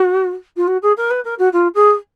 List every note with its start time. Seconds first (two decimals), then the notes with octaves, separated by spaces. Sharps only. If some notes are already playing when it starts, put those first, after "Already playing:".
Already playing: F#4
0.56 F4
0.67 F#4
0.82 G#4
0.97 A#4
1.10 B4
1.24 A#4
1.38 F#4
1.52 F4
1.74 G#4